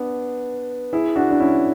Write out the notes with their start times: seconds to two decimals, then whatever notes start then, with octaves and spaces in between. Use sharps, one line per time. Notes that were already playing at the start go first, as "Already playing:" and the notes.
Already playing: B3 D4
0.93 E4 G#4
1.16 D4 F#4
1.31 D4
1.40 C#4 E4